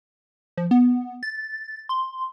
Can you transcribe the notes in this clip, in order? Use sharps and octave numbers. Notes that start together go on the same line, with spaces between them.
F3
B3
A6
C6